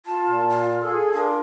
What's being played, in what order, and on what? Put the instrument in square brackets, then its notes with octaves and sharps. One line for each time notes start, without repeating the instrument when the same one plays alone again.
[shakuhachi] F4 [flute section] A5
[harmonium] A#2
[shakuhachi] F4
[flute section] G#4 [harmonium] A4
[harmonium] D4 F4 [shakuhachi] A#4